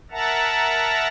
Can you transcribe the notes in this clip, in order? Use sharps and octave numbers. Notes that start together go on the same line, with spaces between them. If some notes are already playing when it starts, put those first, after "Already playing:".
A#4 E5 F#5 A5 A#5